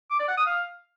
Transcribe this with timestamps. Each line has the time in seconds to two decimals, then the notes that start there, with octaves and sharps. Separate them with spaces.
0.11 D6
0.19 D5
0.28 F#5
0.37 D#6
0.46 F5